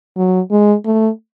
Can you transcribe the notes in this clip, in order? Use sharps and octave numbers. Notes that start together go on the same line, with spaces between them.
F#3
G#3
A3